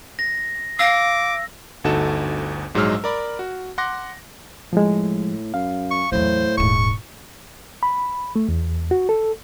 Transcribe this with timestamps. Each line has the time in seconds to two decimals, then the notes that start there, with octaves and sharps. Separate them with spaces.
0.19 A#6
0.79 F5 D6 E6 A#6
1.84 G1 D2 D#4 F#4 A4 E7
2.74 A#1 G#2 F#3 G#3 E6 F6
3.04 A#4 D5 B5
3.39 F#4
3.78 F#5 C6 D6 F#6 A#6
4.73 A2 F3 G#3
5.54 F#2 F5
5.91 C#6
6.12 E2 A2 F#3 C5
6.58 D#1 G#2 C#6
7.83 B5
8.36 A3
8.49 E2
8.91 F#4
9.09 A4